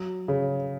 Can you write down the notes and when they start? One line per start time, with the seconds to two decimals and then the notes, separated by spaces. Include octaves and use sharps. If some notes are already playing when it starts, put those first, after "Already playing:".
Already playing: F#3
0.28 C#3